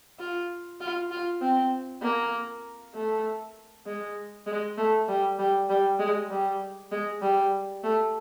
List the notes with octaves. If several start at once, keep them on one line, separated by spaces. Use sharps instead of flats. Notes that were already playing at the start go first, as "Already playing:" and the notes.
F4
F4
F4
C4
A#3
A3
G#3
G#3
A3
G3
G3
G3
G#3
G3
G#3
G3
A3